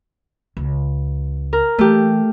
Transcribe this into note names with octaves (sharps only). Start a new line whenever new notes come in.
C#2
A#4
E3 A3 G4